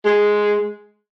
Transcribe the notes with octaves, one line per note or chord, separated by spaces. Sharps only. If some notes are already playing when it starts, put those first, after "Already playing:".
G#3